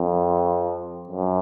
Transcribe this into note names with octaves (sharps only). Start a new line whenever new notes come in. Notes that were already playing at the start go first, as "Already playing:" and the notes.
Already playing: F2
F#2